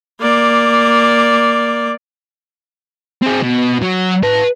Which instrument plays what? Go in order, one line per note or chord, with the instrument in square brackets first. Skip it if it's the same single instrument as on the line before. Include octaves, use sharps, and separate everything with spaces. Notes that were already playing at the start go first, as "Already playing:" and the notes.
[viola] A#3 D5
[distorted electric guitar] C4 G#4
B2
F#3
B4 A5